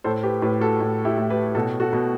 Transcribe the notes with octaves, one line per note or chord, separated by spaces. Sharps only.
A2 A4 C5
G4 B4
A2 G4 B4
F#4 A4
A2
E4 G4
A2
G4 B4
B2 F#4 A4
F#4 A4
B2